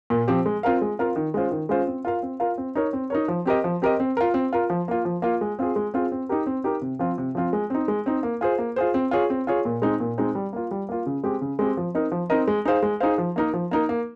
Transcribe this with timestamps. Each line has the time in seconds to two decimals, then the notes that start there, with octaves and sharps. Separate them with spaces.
0.10 A#2
0.28 F3 C4 G4
0.46 G#3
0.63 C4 F4 A#4 F5
0.81 G#3
0.99 C4 F4 A#4 F5
1.16 D#3
1.34 G#3 C#4 F4 C5
1.51 D#3
1.69 G#3 C#4 F4 C5
1.87 C4
2.05 F4 A#4 F5
2.23 C4
2.40 F4 A#4 F5
2.58 C4
2.75 D#4 A#4 C#5
2.93 C4
3.10 D#4 A#4 C#5
3.28 F3
3.45 C4 G4 A#4 D#5
3.64 F3
3.82 C4 G4 A#4 D#5
4.00 C4
4.17 F4 A#4
4.34 C4
4.53 F4 A#4
4.70 F3
4.88 A#3 F4
5.05 F3
5.22 A#3 F4
5.41 G#3
5.59 C4 F4 G#4
5.76 G#3
5.94 C4 F4 G#4
6.12 C4
6.29 D#4 G4 A#4
6.46 C4
6.64 D#4 G4 A#4
6.82 C3
6.99 F3 C4 F4
7.18 C3
7.35 F3 C4 F4
7.53 G#3
7.70 C4 D#4
7.88 G#3
8.06 C4 D#4
8.23 A#3
8.41 F4 G#4 C5
8.58 A#3
8.76 F4 G#4 C5
8.94 C4
9.11 F4 G#4 C#5
9.30 C4
9.47 F4 G#4 C#5
9.65 A#2
9.82 G#3 C4 D#4
10.00 A#2
10.18 G#3 C4 D#4
10.35 G3
10.53 A#3 F4
10.71 G3
10.89 A#3 F4
11.06 C#3
11.24 G#3 C4 G4
11.41 C#3
11.59 G#3 C4 G4
11.77 F3
11.95 C4 D#4 A#4 D#5
12.12 F3
12.30 C4 D#4 A#4 D#5
12.47 G#3
12.65 D#4 G#4 C5 F5
12.82 G#3
13.00 D#4 G#4 C5 F5
13.18 F3
13.36 A#3 D#4 A#4
13.54 F3
13.71 A#3 D#4 A#4
13.89 A#3